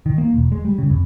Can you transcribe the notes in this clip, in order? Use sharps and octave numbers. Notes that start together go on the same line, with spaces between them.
D#3
A#3
E1
G#3
G3
C#3
F2